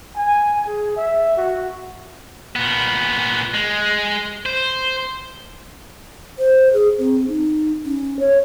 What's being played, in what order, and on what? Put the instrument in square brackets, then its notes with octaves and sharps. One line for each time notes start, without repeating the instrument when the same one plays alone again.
[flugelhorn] G#5
G#4
E5
F#4
[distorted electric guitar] A#2 B3
G#3
C5
[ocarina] C5
G#4
C4
D#4
C#4
C#5